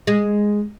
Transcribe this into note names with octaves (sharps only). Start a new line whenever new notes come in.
G#3